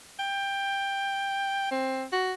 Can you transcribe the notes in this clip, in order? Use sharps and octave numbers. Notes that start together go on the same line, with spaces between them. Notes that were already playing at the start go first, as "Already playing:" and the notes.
G5
C4
F#4